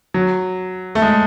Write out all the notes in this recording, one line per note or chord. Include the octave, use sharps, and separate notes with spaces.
F#3
A3
G#3